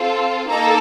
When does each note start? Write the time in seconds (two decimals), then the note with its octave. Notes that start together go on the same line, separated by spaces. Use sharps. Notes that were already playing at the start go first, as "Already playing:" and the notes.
Already playing: C4 F4 A4
0.49 A#3 D#4 A4 A#5